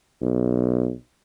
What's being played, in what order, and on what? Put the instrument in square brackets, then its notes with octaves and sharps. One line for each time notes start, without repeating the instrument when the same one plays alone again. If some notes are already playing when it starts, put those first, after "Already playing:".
[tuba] B1